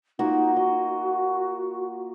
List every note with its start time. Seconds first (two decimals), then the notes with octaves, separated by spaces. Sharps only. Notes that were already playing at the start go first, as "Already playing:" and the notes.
0.19 A#3 D#4 F4 F#4
0.56 F#4 D#5